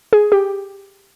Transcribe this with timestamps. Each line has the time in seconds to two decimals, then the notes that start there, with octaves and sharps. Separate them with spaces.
0.13 G#4
0.32 G4